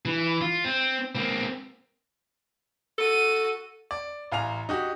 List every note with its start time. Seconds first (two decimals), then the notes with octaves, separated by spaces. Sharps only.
0.05 E3
0.41 F4
0.64 C4
1.15 A#3 C4
2.98 F#4 A4 D#7
3.91 D5
4.32 A1 F5 G#5 A#5 F7
4.69 D#4 F#4 G4